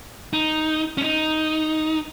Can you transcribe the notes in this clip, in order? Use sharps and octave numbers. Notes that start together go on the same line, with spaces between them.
D#4
C#4
D#4